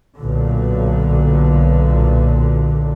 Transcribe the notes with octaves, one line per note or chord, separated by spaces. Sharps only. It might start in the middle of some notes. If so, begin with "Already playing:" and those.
B1 A#2 D3